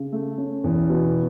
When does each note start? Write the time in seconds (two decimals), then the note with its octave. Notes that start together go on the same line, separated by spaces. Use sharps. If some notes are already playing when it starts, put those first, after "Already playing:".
Already playing: C#3
0.12 A3
0.38 C#4
0.64 E2
0.89 B2